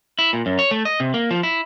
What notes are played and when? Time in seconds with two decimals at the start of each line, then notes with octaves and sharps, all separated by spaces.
0.19 E4
0.33 A#2
0.46 F#2
0.59 C#5
0.71 A3
0.85 D#5
1.00 C3
1.14 A#3
1.31 F3
1.43 E4